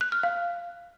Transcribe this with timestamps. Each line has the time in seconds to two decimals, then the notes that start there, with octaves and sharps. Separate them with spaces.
0.01 F#6
0.12 F6
0.23 F5